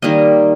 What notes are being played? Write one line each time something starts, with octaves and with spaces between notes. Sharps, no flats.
D#3 G3 A#3 D#5